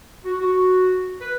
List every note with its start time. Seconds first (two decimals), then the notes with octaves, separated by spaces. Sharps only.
0.24 F#4
0.41 F#4
1.20 B4